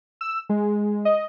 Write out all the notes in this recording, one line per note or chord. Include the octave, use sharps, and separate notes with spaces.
E6
G#3
D#5